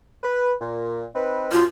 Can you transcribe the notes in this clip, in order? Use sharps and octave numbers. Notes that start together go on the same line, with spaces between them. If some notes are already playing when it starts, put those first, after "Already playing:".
B4
A#2
C4 D#4 B4
F#2 F4